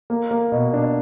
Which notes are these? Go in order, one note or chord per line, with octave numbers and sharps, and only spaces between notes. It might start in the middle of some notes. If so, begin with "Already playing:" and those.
A#3
A#3
B2
D4